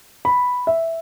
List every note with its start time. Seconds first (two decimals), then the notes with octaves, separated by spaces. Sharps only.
0.25 B5
0.67 E5